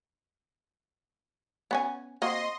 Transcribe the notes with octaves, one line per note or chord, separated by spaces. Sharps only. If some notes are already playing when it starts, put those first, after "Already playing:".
B3 C#4 G#5
A#3 C4 F#4 D#5 C6